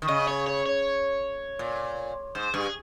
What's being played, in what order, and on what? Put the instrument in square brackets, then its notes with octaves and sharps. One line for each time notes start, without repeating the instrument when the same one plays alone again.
[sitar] D#3
[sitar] C#3 [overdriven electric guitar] D#5
[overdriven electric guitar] C#5
C#5
C#5
[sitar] A#2
[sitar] G#2 [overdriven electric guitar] C5
[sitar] G2 [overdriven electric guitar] G#4